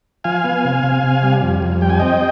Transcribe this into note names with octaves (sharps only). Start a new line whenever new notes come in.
F3 F5 G#5
B3
C3
C3
C3
G3
F2
F2
G3 G5
G#5
C4 D#5 G5